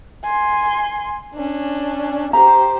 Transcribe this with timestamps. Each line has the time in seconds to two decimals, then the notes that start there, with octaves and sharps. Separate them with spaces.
0.23 G#5 C6
1.34 C#4 D4
2.33 G4 C5 A#5